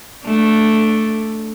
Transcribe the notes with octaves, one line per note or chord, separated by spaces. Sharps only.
A3 D4